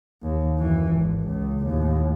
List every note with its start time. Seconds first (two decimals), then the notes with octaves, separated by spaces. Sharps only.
0.23 D#2
0.58 F#2 E3
0.90 G#1
1.26 C#2
1.66 D#2 A2